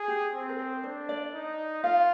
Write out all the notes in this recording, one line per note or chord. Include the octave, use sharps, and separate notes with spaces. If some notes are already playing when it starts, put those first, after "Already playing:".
Already playing: G#4
G4
C4
A#4
C5
D4 C5
D5
D#4
F4 F5